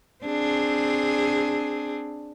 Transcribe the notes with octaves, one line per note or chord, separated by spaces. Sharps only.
C4 D4 G#4